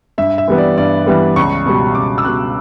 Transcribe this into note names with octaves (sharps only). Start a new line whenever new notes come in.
G2 E5
E5
E3 G3 B3
D5
G2 D5
E3 G3 B3
C#2 C#6
B2 G3
C#2 D6
E6
B2 G3 F#6